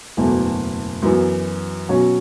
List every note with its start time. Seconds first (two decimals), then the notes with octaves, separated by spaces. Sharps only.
0.17 F#1 E2 B2 A3
1.02 F#2 E3 B3
1.89 B2 F#3 C#4 F#4 C#5